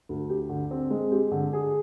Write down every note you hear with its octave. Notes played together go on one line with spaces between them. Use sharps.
D2
G4
D3
C4
G#3
G4
D3
G#4